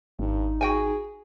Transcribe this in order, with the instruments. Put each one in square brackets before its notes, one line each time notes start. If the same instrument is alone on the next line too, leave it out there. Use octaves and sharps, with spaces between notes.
[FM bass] G#1 [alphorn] G2 [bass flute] D#4
[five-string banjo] F#4 G5 G#5 [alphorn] G#4